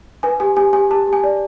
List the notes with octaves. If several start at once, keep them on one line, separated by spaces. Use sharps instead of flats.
B4 G#5
G4 G#5
G4 G#5
G4 G#5
G4 A5
G4
G#5
D5